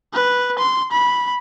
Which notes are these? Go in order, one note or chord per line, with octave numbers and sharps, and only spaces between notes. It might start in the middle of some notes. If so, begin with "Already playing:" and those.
B4
C6
B5